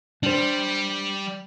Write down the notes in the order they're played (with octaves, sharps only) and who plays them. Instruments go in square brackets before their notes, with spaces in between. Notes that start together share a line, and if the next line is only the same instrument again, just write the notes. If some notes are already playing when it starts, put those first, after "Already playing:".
[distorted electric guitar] G3 [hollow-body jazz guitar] D4 C5